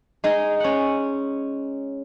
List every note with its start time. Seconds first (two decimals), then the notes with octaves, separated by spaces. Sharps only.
0.24 G#3 D#4 G#4
0.60 C#4 F#5